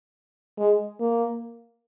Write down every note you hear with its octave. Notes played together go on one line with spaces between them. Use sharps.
G#3
A#3